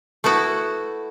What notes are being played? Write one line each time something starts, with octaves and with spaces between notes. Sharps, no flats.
A3 B3 E4 F#4